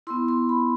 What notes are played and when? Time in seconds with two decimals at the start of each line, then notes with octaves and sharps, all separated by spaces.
0.07 B3 E4 C6
0.28 C6
0.49 B5